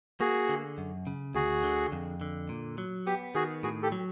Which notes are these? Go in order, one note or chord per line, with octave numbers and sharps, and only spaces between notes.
A#3 F#4 G#4
D3
F#2
C#3
D2 F#4 G#4
D3
F2
D3
A#2
F#3
B3 G4
D#3 F#4 G#4
A2 F#4 G#4
G4 A4
F#3